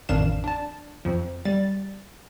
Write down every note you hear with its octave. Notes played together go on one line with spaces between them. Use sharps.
A1 F2 D#3 D4 F5 E7
D4 A5
F2 F3
G3 A6